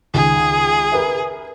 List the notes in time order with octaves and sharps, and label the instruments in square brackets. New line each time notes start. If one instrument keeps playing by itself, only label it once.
[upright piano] C#2 D#3 [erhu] G#4
[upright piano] A#4 B4 E5